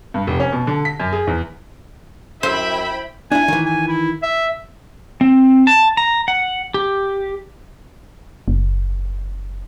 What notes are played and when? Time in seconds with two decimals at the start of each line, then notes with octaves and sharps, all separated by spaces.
0.14 G2
0.27 F1
0.40 C#4
0.52 B2
0.67 D3
0.85 B6
1.00 F#2
1.12 G#4
1.27 E2
2.43 F#2 E4 C5 E5 G5 B5
3.32 D4 E4 G#5
3.48 D#3 E3
3.65 G#5
3.88 E4
4.23 E5
5.21 C4
5.67 A5
5.97 A#5
6.28 F#5
6.74 G4
8.48 F#1